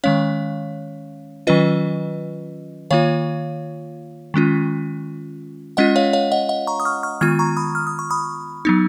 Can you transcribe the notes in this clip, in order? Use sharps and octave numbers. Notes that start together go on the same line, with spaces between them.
D#3 G#3 C#4 C#5 F5
D#3 F#3 C#4 F4 B4 D#5
D#3 A#3 F4 C#5 F5
D#3 G#3 C#4 F4
G#3 C#4 F4 D#5 F#5
C#5 F5
C#5 F5
D#5 F#5
D#5 F#5
A#5 C#6
D#6
C#6 F6
C#6 F6
D#3 G#3 B3 F4 F6 G#6
A#5 C#6
B5 D#6
F6
D#6
C#6
B5 D#6
F#3 B3 D#4